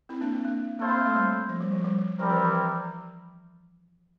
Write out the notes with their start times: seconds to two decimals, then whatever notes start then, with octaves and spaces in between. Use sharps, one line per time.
0.09 C4 E4
0.21 A#3 D4
0.33 C4
0.45 A#3
0.79 A#3 E4 A4 C5 F5
0.88 C4
1.05 A3
1.14 G3
1.49 F3
1.60 G3
1.72 F3
1.84 G3
2.18 F3 G3 C4 E4 G4 A#4
2.30 E3
2.42 E3